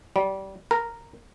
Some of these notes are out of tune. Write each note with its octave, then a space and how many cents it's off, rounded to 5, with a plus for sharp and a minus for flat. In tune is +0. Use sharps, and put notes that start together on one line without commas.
G3 -20
A#4 -5